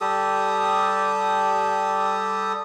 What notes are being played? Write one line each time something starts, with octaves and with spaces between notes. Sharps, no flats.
G3 G4 A4 D#6